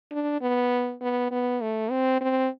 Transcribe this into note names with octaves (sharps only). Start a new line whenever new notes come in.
D4
B3
B3
B3
A3
C4
C4